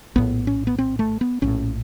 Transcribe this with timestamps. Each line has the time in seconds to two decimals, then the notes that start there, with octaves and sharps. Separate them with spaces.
0.16 A#1 A2 B3
0.47 C#4
0.67 B3
0.78 C4
0.99 A3
1.21 B3
1.42 A#1 A2 C#4